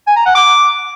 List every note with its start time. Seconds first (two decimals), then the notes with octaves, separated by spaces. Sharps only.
0.07 G#5
0.16 A#5
0.26 F#5
0.35 D6